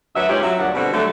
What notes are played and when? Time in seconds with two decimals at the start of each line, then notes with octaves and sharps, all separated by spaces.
0.16 D2 F#3 B4 E5
0.29 G#2 G#3 C#4 F4 G4
0.43 F#3 E5
0.59 D2 G2 A#2 F#3 D4 F#4
0.75 B2 D3 G3 C4 F#4
0.93 D3 F#3 G3 A3